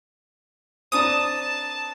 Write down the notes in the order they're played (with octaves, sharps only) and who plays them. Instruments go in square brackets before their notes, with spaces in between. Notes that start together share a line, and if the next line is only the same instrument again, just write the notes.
[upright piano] C4 D4 A#5 [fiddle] A5 [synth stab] D#6